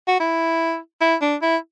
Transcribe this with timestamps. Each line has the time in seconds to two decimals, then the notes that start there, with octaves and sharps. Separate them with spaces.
0.08 F#4
0.20 E4
1.01 E4
1.21 D4
1.42 E4